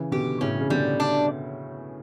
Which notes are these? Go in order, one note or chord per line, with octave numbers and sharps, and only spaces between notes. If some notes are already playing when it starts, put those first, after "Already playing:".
Already playing: C#3 E3
B2 D3 G4
A2 C#3 C#4
C#3
B2 D3 G3
D4